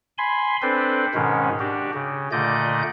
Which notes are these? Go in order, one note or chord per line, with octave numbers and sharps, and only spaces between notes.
G#5 B5 C6
C4 D4 A4 B4 C5
G#2 B2 D#3 G#3 C#4
D4 F#4 G4
C#3
A#2 D3 A3 D5 D#5 G6